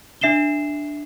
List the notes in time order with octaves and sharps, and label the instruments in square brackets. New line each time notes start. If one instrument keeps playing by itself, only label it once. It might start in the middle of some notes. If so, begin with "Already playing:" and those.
[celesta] D4 E5 C7 E7 G7